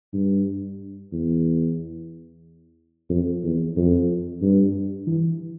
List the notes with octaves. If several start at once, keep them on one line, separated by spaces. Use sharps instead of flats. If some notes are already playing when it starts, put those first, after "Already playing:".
G2
E2
F2
E2
F2
G2
E3